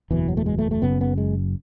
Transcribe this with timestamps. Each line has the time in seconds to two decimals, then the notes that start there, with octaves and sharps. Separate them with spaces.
0.10 F#1 E2 B2 E3
0.28 F#3
0.37 A3
0.46 G#3
0.59 A3
0.71 A3
0.82 F#1 F#2 C#3 B3
1.01 B3
1.18 G#3